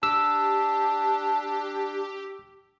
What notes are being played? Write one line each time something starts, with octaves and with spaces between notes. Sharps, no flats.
D4 G4 E6